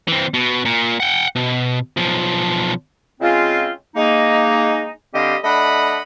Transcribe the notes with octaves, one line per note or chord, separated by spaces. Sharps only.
E3 C4
B2
A#2
F#5 G5
B2
B1 F3
C#3 G#3 C4 C#4 F4
G#3 A#3 D#4
D3 G3 C4 G4 D#5 F5
A3 D4 D#5 F#5 B5